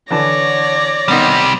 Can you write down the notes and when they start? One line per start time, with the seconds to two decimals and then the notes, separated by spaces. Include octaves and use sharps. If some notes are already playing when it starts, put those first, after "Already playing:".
0.10 D3 E3 C#5 D5 A5 A#6
1.08 C3 D#3 G3 B3 D#4